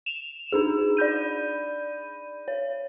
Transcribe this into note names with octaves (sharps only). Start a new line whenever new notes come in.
E7 F7
D4 D#4 G#4
D5 B5 G6 D#7
C#5